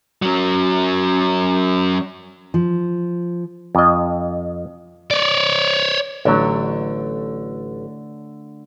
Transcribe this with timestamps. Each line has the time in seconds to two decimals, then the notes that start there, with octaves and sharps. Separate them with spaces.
0.22 F#3 C#4
2.54 F3
3.75 F2 D#5
5.11 C#5 D5
6.25 A1 D3 F#3 A3